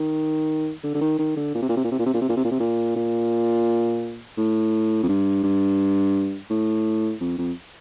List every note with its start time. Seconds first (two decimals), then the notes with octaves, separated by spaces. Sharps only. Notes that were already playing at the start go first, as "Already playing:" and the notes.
Already playing: D#3
0.83 D3
0.94 D3
1.01 D#3
1.19 D#3
1.37 D3
1.55 A#2
1.62 C3
1.69 A#2
1.77 C3
1.84 A#2
1.92 C3
1.99 A#2
2.06 C3
2.14 A#2
2.21 C3
2.29 A#2
2.37 C3
2.44 A#2
2.51 C3
2.60 A#2
2.96 A#2
4.37 A2
5.03 F2
5.08 G2
5.44 G2
6.50 A2
7.20 F2
7.38 F2